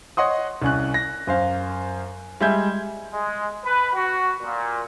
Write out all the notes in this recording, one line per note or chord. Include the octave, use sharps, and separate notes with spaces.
C#5 D#5 F#5 C6 D#6
C2 C#4 F#6
A#6
F#2 C5 F5
G3 G#3 E5 G6 G#6
G#3
B4
F#4
A#2